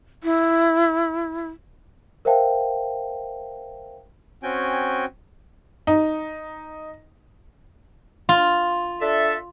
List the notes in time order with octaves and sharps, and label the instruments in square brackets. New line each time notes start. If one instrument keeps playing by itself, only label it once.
[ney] E4
[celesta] A#4 C5 E5 F5 G5 A5
[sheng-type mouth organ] C4 C#4 F#4 G5 G#5
[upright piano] D#4
[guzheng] F4
[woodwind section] D4 A4 E5